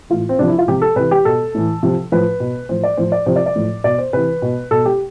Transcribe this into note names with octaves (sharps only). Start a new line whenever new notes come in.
A2 E3 F4
C4
C3 F3 D4
E4
F4
C3 F3 G4
A4
C3 E3 B4
G4
B2 A4
A2 E3
C3 F3
A2 F3 B4
B2
A2 F3 C5
D5
A2 F3 C5
D5
C3 F3 C5
D5
D5
A2 F3
B2 D5
C5
C3 E3 B4
B2
B2 A4
G4